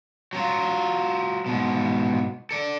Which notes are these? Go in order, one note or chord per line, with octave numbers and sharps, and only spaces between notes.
F#3 F4
G#2 B2
A4 D5